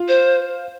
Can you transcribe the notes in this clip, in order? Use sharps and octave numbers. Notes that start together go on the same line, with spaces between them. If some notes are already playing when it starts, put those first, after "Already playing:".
Already playing: F4
C5